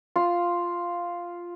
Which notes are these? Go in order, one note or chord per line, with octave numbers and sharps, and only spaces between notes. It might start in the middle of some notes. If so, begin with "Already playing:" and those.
F4